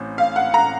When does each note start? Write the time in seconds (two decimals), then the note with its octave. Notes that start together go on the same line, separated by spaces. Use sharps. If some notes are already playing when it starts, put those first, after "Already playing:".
Already playing: A1 A2 C4
0.18 F5
0.36 F#5
0.54 A#5